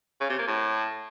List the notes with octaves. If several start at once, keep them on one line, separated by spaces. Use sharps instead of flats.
C#3
C3
A#3
A2